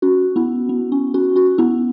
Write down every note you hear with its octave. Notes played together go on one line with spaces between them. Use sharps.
C#4 F#4
B3 E4
B3
C#4
C#4 F#4
C#4 F#4
B3 E4